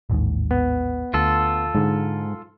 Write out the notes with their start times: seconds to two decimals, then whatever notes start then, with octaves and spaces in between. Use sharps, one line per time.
0.10 A1 D#2 G#2
0.51 B3
1.14 D2 F4 A4
1.75 G#2 D3 G#3